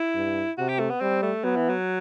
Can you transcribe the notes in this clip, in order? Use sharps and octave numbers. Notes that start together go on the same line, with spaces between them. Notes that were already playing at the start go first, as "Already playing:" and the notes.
Already playing: E4
G2
C3 F#4
G4
A3
B3
G3 C4
A3
F#3 B3
E3
F#3